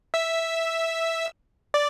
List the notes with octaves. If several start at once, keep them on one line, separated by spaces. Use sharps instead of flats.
E5 E6
D5